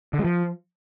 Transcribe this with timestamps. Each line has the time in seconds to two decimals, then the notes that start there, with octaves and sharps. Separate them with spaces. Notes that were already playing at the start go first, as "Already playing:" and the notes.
0.13 D3
0.19 G#3
0.24 F3